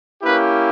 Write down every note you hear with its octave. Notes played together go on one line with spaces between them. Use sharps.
A#3 C#4 E4 G4 B4